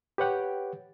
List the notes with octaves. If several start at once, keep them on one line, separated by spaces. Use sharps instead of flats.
G4 B4 C#5 F#5 G5